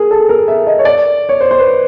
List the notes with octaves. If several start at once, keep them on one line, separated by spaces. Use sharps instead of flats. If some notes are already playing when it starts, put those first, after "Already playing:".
Already playing: G#4 A#4
A4
A#4
E5
D#5
C#5
D5
C#5
C5
C5
B4